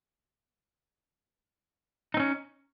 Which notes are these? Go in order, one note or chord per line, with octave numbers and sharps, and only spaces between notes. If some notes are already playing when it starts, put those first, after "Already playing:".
C4 C#4 D#4